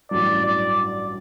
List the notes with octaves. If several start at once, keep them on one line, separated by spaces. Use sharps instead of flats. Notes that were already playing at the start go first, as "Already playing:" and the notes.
A1 G2 F#3 D5
D5